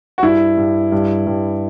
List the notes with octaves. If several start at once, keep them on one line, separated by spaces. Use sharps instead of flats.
F#4
G2 E4
G2
G2
G2